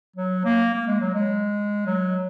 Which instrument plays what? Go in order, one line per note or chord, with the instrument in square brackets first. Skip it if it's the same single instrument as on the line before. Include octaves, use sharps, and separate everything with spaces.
[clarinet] F#3
A#3
A#3
G#3
F#3
G#3
F#3